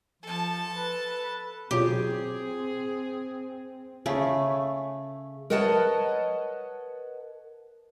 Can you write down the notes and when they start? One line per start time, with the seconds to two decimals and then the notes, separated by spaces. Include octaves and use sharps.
0.23 F3 A4 A5
0.74 B4
1.71 B2 F#3 C4 F4 G4 G#4
4.06 C#3 A3 G#4
5.50 A#4 B4 C#5 D#5 F#5 A5